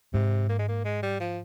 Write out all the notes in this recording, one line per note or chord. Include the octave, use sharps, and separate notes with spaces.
G#2 C3
A#3
G#3
A#3
G#3
G3
F3